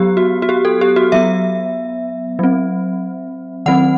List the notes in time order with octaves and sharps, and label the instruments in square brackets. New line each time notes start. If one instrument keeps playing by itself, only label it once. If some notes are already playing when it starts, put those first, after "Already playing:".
Already playing: [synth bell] F#3 B3 G4
F#4
F#4
G4
A4
G4
F#4
F#3 B3 E5
F#3 C4
D#3 F#3 C4 F#5